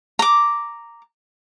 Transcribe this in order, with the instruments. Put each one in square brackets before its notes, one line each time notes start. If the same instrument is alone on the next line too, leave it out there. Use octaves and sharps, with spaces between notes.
[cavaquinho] A#5 D6